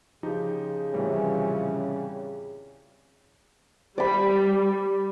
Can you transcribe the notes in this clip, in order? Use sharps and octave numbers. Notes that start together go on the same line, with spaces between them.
C#3 F3 D#4 G4
A2 C3 E3 F3 G3 C#4
G3 D5 B5